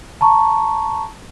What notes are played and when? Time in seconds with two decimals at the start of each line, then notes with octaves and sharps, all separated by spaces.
0.21 A5 A#5 C#6